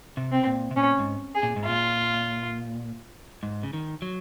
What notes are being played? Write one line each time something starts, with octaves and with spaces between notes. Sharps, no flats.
C3
C4
A#2
C3
A#2 C#4
G#2
G#4
A#2
G#2
A#2 F4
G#2
C#3
D#3
F#3